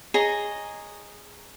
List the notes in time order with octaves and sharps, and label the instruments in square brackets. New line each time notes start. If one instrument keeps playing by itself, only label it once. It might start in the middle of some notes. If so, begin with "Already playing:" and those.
[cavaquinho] G#4 C#5 D#5 A#5